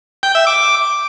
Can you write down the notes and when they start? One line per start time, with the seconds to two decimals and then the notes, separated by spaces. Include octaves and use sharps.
0.23 G5
0.35 E5
0.47 D6